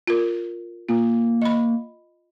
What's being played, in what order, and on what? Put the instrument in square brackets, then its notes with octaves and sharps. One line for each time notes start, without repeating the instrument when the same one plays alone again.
[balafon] F4 A#4
[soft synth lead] A#3 [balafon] F4
[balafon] D#5 B5